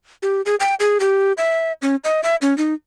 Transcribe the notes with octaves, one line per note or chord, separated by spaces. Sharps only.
G4
G#4
G5
G#4
G4
E5
C#4
D#5
E5
C#4
D#4